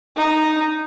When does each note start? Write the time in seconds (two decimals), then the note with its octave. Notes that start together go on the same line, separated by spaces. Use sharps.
0.16 D#4